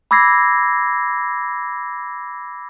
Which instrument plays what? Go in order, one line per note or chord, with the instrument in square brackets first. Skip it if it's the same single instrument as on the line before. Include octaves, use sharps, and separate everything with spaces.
[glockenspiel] B5 D6 E6 G#6 A#6 C7